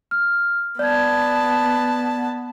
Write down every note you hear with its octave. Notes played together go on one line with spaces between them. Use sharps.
F6
B3 D5 A5 G#6